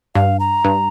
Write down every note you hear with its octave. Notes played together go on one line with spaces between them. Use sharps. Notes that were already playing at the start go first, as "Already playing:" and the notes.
G2 F5
A#5
G2